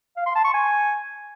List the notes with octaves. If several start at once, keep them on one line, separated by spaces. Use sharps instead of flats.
F5
C6
A5
C#6
G#5